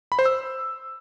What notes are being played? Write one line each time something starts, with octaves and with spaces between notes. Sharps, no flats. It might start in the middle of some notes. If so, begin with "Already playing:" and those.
B5
C5
E6